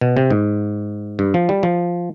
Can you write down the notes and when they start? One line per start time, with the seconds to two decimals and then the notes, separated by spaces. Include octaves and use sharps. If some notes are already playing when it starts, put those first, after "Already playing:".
0.01 B2
0.17 C3
0.30 G#2
1.19 G2
1.34 F3
1.49 G3
1.63 F3